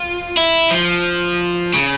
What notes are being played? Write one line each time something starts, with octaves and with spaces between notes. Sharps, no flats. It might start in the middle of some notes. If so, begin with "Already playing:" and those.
Already playing: F4
E4
F3
C#3